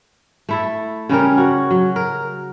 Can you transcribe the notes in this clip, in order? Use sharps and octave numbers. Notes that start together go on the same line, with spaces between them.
A3 E4 A4
C#3 G3 C#4 A#4
F#4 C#5
F#3
A#4